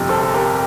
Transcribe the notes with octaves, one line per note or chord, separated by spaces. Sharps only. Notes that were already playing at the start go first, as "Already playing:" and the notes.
Already playing: G1 F2 C3
A4 C5
A4
G4 A#4